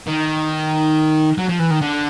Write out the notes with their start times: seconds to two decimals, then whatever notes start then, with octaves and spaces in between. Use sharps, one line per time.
0.07 D#3
1.38 F#3
1.49 F3
1.59 E3
1.71 D#3
1.81 D3